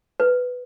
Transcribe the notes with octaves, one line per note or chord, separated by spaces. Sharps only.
B4